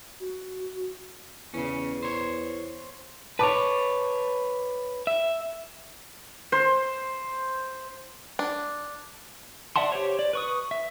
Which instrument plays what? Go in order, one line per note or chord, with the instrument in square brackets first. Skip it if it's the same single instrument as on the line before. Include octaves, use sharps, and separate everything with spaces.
[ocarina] F#4
[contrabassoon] E2 [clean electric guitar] C#3 C#4
[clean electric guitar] C5 C#5
[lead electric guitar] B4 C#5 [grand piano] A5 D6
[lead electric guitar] E5
[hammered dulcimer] C5
[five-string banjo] D4
[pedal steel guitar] D5 E5 F#5 A5 C6
G4 C5 C#5
D5
B4 C#6 D#6
E5